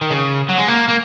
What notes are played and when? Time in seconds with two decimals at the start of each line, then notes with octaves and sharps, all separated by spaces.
0.01 D#3
0.10 C#3
0.49 F#3
0.58 G#3
0.68 A#3
0.88 A#3